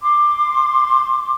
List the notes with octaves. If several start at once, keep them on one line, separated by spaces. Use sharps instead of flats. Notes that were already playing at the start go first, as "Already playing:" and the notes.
C6 D6